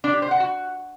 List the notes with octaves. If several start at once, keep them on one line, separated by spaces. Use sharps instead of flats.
D4
G4
C5
F#5
F#4